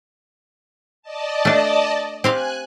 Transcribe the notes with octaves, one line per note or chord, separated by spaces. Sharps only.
D5 D#5 A5
A3 D4
C4 G4 F5 G#5 F#6